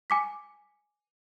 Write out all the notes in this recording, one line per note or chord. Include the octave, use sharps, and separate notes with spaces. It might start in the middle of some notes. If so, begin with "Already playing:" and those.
G#5 D6 B6